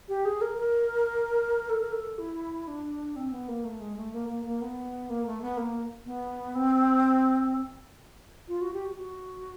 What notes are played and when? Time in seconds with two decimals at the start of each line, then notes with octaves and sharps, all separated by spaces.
0.08 G4
0.25 G#4
0.41 A#4
0.58 A#4
1.70 A4
1.81 A#4
1.92 A4
2.18 E4
2.68 D4
3.16 C4
3.31 B3
3.48 A#3
3.64 A3
3.80 G#3
3.97 A3
4.13 A#3
4.29 A#3
4.45 A#3
4.61 B3
5.09 A#3
5.26 A3
5.42 B3
5.57 A#3
6.06 B3
6.55 C4
8.48 F4
8.61 F#4
8.74 G4
8.86 F#4
8.98 F#4